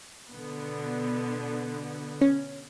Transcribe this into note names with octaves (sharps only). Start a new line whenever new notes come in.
B2 D3 B3
C#4